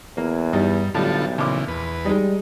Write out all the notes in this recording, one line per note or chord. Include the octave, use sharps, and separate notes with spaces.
E2 A#3
G2 G3 D#4
B1 A2 D3 G3 F4 A4
A#1 C#3 E3 D6
E2 B4
G3 G#3 D#4